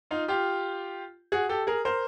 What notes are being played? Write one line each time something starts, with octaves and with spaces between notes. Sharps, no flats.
D#4 F4
F4 G4
F#4 G#4
G4 A4
G#4 A#4
A#4 C5